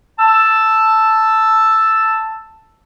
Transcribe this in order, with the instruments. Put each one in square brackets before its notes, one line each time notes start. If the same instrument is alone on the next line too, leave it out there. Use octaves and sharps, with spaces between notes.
[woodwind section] A5 E6